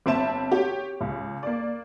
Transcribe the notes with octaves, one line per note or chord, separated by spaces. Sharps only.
G1 C4 E5 A5 E7
G4 C#5
C#2
A#3 D5